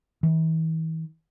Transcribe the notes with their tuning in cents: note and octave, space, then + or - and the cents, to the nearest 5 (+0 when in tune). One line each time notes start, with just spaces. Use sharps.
E3 -40